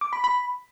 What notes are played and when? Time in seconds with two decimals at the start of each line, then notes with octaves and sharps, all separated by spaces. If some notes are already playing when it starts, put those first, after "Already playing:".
0.01 D6
0.13 B5
0.24 B5